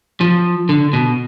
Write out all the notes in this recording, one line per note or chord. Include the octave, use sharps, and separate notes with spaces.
F3
D3
B2